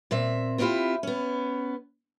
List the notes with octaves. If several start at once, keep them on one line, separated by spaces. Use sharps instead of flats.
A#2 C4 E5
B3 C4 D4 E4 F4 G4
B3 C#4